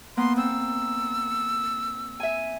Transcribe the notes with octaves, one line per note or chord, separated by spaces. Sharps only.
A#3 B3 C6
C4 E6
E5 G#5